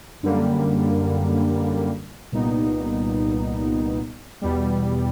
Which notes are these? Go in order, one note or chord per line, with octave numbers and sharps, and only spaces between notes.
F#2 D3 G3 A#3
C2 A#2 G3 B3 D#4
E2 B2 G3